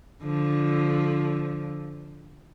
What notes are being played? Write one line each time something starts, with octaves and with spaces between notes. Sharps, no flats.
D3 F3